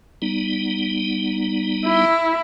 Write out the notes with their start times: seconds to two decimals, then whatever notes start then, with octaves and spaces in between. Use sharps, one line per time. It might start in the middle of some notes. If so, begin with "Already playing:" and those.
0.22 G3 B3 D#4
1.85 E4